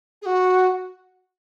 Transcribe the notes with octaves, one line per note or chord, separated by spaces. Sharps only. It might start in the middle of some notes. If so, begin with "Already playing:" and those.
G#4
F#4